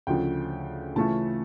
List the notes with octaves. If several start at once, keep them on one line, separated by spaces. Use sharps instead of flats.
D2 C#3 F3 G5
C#3 E3 A3 C#4 F4 A5